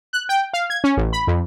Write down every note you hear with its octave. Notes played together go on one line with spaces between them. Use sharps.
F#6
G5
F5
G#6
C#4
A1
B5
F2